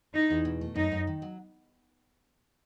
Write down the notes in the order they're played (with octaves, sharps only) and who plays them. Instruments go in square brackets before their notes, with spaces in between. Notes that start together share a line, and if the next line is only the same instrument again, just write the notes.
[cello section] D#4 [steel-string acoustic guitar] E4
[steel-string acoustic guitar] E2
B2
A3
[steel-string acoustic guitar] F#2 [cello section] D#4
[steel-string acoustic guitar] F#2
D#3
F#3